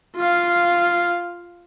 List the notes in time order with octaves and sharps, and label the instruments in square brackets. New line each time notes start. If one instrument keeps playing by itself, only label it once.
[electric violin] F4 F5